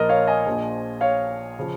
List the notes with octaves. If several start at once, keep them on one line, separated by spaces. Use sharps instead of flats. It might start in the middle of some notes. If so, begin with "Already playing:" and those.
Already playing: A#1 A#2 F3 A#4 D#5
C#5 F5
D#5 G#5
A#1 A#2 F3
C#5 F5
C#3 F3